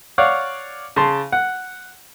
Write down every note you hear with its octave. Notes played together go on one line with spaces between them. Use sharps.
C#5 D5 F5 F#5
C#3 A5 C6
F#5